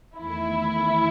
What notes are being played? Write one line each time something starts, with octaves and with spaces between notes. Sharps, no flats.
E2 D#3 A3 E4